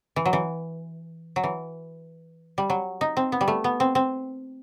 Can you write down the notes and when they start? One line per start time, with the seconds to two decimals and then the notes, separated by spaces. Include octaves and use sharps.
0.16 E3
0.25 F#3
0.33 E3
1.36 F#3
1.44 E3
2.58 G3
2.70 F#3
3.01 D#4
3.17 C4
3.32 B3
3.41 G3
3.48 A3
3.64 B3
3.80 C4
3.95 C4